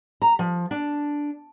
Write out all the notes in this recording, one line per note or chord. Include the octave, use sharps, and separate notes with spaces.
A#5
F3
D4